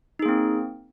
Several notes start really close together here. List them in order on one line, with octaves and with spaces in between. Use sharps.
D#4 G#4 A#3 C4